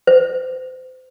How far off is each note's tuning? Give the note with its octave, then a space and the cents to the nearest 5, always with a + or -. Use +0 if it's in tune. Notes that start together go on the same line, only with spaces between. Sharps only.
C5 -30